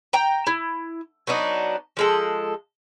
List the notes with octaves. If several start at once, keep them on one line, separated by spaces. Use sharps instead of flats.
G5 A#5
E4
F#3 B3 D4 D#4
F3 G#3 A4